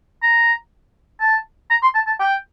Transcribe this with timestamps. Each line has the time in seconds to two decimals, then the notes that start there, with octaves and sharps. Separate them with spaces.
0.23 A#5
1.21 A5
1.71 A#5
1.83 C6
1.95 A5
2.07 A5
2.20 G5